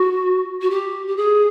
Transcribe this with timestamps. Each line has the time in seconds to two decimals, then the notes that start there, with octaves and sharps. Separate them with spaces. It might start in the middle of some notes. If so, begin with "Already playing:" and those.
Already playing: F#4
0.61 F#4
0.70 G4
1.07 G4
1.16 G#4